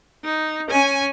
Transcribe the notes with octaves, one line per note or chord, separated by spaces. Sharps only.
D#4
C#4 G#5